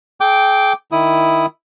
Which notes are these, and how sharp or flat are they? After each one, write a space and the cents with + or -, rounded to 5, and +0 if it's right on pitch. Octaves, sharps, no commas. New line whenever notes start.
G#4 +35 G5 -5 D6 +0
D#3 +0 E4 +0 D#6 +0